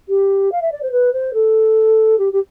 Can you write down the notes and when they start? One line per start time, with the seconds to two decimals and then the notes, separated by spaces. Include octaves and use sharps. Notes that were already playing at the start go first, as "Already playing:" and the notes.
0.08 G4
0.52 F5
0.62 E5
0.72 D5
0.82 C5
0.92 B4
1.13 C5
1.33 A4
2.18 G4
2.33 G4